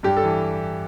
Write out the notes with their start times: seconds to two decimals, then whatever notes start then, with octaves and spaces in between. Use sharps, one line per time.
0.03 G2 G4
0.17 A4
0.24 E3